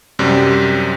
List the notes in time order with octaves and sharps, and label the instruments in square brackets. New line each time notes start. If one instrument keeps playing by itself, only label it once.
[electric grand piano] F#2 C3 G3